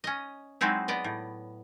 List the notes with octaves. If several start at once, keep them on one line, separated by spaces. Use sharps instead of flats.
C#4 D#5
F#3 G#3 C4 D#4 E4
B3 D5 D#5
A2